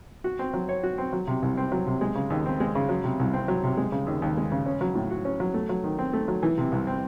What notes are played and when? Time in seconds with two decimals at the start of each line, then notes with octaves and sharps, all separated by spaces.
0.24 F#4
0.39 C4
0.54 F#3
0.69 C#5
0.83 F#4
0.98 C4
1.13 F#3
1.27 C3
1.42 C2
1.57 C4
1.72 F#3
1.86 C3
2.01 G#3
2.15 C#3
2.30 D#2
2.46 C4
2.60 G#3
2.75 C#3
2.89 F#3
3.04 C3
3.19 C2
3.34 C4
3.48 F#3
3.64 C3
3.77 G#3
3.92 C#3
4.07 D#2
4.22 D#2
4.37 G#3
4.52 C#3
4.66 C#4
4.81 F#3
4.95 A2
5.10 F#4
5.25 C#4
5.40 F#3
5.54 A3
5.69 F#3
5.84 D#3
5.99 C4
6.13 A3
6.28 F#3
6.43 E3
6.58 C3
6.72 C2
6.87 C4